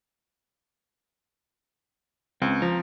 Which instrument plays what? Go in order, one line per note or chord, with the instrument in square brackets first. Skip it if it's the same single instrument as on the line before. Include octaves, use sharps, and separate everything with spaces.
[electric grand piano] C#2 [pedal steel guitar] C4
[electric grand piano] F3 [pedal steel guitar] A#5